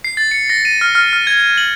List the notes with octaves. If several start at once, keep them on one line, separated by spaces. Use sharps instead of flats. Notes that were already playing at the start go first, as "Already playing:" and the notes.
C7
A6
C#7
A#6
D#7
F6
F6
F6
G#6
D#7
F#7